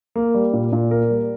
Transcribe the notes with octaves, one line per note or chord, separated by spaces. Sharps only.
A#3
G3
A#2
A#2
A#3 A#4
G3